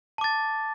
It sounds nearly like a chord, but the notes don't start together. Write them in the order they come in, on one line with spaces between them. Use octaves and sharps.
A5 D6 A6